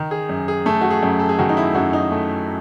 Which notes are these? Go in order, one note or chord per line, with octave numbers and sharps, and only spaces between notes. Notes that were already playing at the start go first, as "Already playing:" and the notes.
Already playing: D#3
G#4
F#2
G#4
A3 A4
F#4
G#4
F#2
A4
G#4
D#3 F#4
D#4
E4
F#2 F#4
D#4
A3